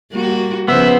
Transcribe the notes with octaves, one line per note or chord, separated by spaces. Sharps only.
G3 A#3 F#4
C#3 F3 B3 C5 E5